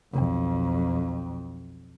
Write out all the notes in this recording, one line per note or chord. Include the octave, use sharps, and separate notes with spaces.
B1 F2